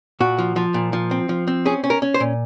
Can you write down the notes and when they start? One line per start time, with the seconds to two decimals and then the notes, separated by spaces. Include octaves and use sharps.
0.20 A#2 F#4
0.38 F3
0.56 F3
0.74 A#2
0.93 F3
1.11 C4
1.29 F3
1.47 C4
1.66 C#4 G#4
1.84 C#4
1.90 A#4
2.02 C#4
2.14 C5
2.20 A#2